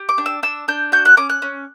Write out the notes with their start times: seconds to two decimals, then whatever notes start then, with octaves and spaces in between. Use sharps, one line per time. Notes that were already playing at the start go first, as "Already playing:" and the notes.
Already playing: G4
0.09 D6
0.18 D4
0.26 E6
0.43 D4 E6
0.68 D4 G6
0.92 F#4 G6
1.05 F#6
1.17 C#4 D6
1.29 F#6
1.42 C#4